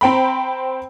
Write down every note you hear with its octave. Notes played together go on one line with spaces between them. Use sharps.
C4 C5 G5 A#5 B5